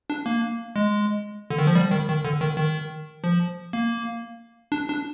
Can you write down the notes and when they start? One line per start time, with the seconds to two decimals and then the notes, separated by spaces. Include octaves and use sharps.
0.10 D4
0.26 A#3
0.76 G#3
1.50 D3
1.59 D#3
1.67 F3
1.75 G3
1.91 D#3
2.08 D#3
2.25 D3
2.41 D#3
2.57 D#3
3.24 F3
3.73 A#3
4.72 D4
4.89 D4